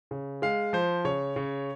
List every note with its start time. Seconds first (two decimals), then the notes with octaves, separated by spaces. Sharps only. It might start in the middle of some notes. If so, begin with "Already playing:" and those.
0.11 C#3
0.42 G#3 F5
0.73 F3 C5
1.05 C#3 C#5
1.36 C#3